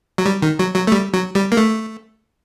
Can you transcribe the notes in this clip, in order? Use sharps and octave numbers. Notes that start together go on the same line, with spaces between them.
F#3
G3
D#3
F#3
F#3
A3
G3
F#3
G3
A#3
A3